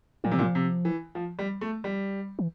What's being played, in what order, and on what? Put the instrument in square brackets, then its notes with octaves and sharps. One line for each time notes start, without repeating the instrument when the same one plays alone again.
[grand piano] A#2 [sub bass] F3
[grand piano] C3 [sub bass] E3
[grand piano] A#2 [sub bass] F3
[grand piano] C3
E3
F3
G3
A3
G3
[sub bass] E3